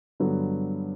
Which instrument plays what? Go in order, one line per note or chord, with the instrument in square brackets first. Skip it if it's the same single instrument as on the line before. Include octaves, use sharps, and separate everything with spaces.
[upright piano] G2 D3 F#3 B3